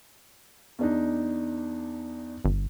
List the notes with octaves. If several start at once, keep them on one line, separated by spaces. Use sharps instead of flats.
E2 D4 D#4
G1